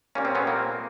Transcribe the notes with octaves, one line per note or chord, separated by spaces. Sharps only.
A#2 G3 A#3 C#4
C4
B3 C#4
A#3 C4